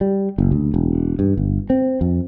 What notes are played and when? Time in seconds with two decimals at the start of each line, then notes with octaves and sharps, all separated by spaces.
0.01 G3
0.38 F#1
0.52 D2
0.74 E1
1.19 G2
1.37 G1
1.70 C4
2.01 F2